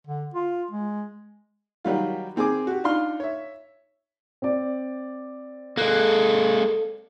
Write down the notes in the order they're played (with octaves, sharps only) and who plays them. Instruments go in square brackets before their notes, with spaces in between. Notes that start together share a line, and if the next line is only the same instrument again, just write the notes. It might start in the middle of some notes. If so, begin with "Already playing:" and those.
[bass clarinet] D3
F4
G#3
[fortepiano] D#3 F#3 G3 F4
D#3 C4 G#4 G#5 D6
F#4 G4
D4 D#4 F4 C6 F6
C#5 E5
[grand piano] C4 D5
[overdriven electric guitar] G#3 A#3 [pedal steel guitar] A4 F#6